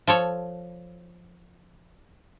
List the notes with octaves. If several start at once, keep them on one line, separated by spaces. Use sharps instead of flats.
F3 A4 C#5